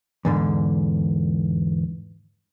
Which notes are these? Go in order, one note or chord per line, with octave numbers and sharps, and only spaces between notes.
E2 G#2 D3